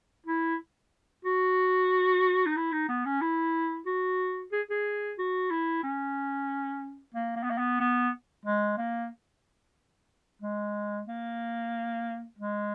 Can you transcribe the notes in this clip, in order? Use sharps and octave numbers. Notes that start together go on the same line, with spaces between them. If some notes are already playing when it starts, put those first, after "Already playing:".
E4
F#4
D#4
E4
D#4
B3
C#4
E4
F#4
G#4
G#4
F#4
E4
C#4
A#3
A#3
B3
A#3
B3
B3
G#3
A#3
G#3
A#3
G#3